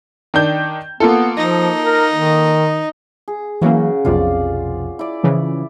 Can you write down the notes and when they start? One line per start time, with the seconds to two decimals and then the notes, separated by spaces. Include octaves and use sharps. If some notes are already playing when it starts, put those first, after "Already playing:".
0.34 D#3 D4 G6
1.00 A#3 B3 F4 A4
1.37 F3 D#4
1.83 A#4
2.13 D#3
3.28 G#4
3.62 C#3 E3 F#3 A#3 F#4
4.05 B1 F2 C3 F4 D5
4.99 E4 D5
5.23 C#3 E3 F3